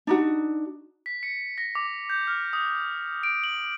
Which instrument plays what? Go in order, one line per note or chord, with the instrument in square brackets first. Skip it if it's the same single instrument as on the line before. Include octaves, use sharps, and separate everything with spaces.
[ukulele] D4 D#4 F#4
[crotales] B6
C#7
A#6
D6
G6
F6
D#6
D7
F#7